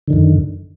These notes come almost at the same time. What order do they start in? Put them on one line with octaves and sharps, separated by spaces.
D3 D#3 F#2